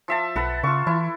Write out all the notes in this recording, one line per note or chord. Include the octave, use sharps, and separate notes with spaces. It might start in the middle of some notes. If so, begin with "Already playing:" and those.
F3 E5 A5
B1 A4 B4 F#5
C#3 F4 C#6
E3 E4